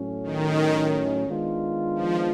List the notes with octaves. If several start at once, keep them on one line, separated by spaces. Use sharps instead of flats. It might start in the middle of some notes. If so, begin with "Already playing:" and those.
Already playing: A2 F#3 A3 C#4
D#3
D#3 G#3 B3 D4 F4
F3